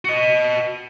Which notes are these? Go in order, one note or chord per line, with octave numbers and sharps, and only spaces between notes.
F#4 D#5